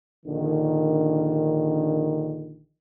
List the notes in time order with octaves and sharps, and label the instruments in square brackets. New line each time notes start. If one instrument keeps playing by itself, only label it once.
[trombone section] A#1 D3 D#3